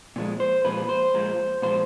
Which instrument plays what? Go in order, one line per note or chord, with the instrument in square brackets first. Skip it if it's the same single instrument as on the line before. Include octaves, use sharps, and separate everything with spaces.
[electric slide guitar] A#2 F3 G#3
C5
A#2 F3 G#3 B4
C5
A#2 F3 G#3
A#2 F3 G#3 C5